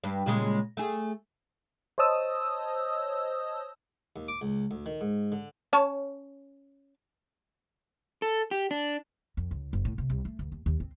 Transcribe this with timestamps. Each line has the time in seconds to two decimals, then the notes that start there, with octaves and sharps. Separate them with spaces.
0.04 G2
0.26 A#2 C#3 G#3
0.77 A3 G#4
1.98 C5 C#5 D#5 A5 D#6 E6
4.16 D#2
4.28 D6
4.41 C#2
4.71 D2
4.86 D#3
5.01 G#2
5.32 D3
5.73 C#4 C#5 A5
8.22 A4
8.51 G4
8.71 D4
9.37 F2
9.51 C#2
9.73 F#1
9.85 A2
9.98 C3
10.10 C2
10.25 A3
10.39 D2
10.52 D#2
10.66 D#2
10.80 C4